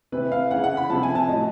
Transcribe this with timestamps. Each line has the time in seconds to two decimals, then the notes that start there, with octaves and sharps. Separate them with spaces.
0.12 C3 E3 B4
0.32 F5
0.51 C#3 E3 F#5
0.64 F#5
0.77 B5
0.89 C3 F3 A5
1.03 G#5
1.15 A5
1.28 A2 F#3 D#5